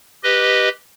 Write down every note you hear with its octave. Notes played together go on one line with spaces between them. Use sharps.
G4 B4 D#5